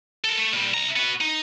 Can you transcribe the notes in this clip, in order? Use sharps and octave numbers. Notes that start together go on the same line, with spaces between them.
A4 A#4
A3
A#2 G3
C2 A#5
B3 F#4
D#4